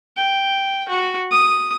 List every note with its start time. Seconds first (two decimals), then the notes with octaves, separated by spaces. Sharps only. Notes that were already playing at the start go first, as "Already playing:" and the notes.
0.17 G5
0.89 F#4
1.31 D#6